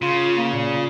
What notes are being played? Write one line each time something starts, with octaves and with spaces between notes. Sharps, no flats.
C#3 F4
A#3
A#2